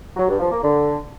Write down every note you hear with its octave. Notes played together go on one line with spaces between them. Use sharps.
F#3
G2
F3
A#3
D3